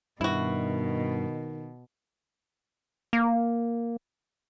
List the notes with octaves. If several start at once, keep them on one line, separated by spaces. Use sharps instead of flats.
G2 B2 D#3 E4 F#4
A#3